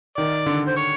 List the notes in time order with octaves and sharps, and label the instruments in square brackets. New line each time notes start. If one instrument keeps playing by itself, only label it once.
[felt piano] D#3 [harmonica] D5
[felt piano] D3
[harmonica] C5
C#5